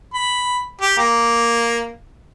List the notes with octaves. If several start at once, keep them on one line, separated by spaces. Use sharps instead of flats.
B5
G4
A#3